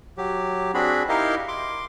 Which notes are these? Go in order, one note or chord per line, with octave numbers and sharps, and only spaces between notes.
F#3 G4
C4 D4 F#4 G#4 B5
D#4 E4 G4 A#4 D#5 F5
C6 D6